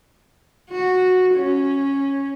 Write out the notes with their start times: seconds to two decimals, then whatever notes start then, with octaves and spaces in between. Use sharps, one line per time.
0.71 F#4
1.35 C#4